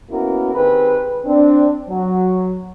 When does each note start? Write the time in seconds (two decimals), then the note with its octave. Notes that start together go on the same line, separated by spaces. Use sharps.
0.10 A#3 B3 C#4 E4 F#4 A#4
0.54 D#3 C4 G4 G#4 B4
1.24 C4 D4
1.88 F#3